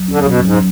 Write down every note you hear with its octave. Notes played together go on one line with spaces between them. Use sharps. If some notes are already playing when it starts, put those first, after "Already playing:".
Already playing: F#3
D3 C#4
C#3
B2 F#3
G#2 F#3